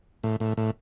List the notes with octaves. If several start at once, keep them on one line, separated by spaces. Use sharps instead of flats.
A2
A2
A2